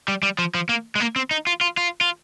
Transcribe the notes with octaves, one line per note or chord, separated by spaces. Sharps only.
G3
G3
F3
F3
A#3
G#3
A#3
C4
D#4
F4
F4
F4
F4